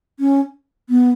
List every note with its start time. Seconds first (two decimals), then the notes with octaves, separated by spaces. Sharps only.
0.20 C#4
0.89 B3